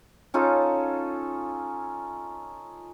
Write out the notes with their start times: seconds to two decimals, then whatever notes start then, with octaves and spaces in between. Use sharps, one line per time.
0.34 C#4 D#4 F4 A4